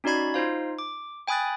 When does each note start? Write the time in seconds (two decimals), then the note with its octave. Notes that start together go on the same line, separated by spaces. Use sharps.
0.04 C#4 D#4 F#4 D5 B5 G#6
0.34 D#4 F4 C5 F5
0.79 D6
1.28 G5 G#5 B5 D#6 F#6 A6